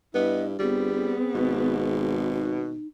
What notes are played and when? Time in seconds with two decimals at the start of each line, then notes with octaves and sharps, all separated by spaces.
0.14 G2 B3 E4 D#5
0.59 G1 G3 B3 C4 G#4
1.34 G#1 B2
2.32 D#4